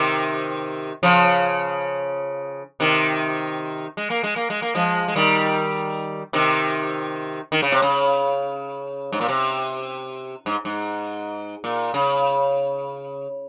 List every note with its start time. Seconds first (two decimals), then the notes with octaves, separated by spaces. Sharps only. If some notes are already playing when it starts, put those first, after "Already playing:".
Already playing: C3 D#3
1.03 C#3 F3
2.80 C3 D#3
3.97 G#3
4.10 A#3
4.23 G#3
4.36 A#3
4.50 G#3
4.62 A#3
4.75 F3 G#3
5.08 G#3
5.16 D#3 G3
6.33 C3 D#3
7.52 D#3
7.62 C#3
7.72 C3
7.82 C#3
9.12 G#2
9.21 A#2
9.28 C3
10.46 G#2
10.65 G#2
11.64 A#2
11.94 C#3